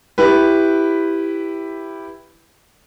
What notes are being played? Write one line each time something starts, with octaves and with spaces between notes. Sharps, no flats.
E4 G4 B4